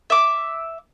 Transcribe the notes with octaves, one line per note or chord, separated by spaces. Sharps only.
E5 D6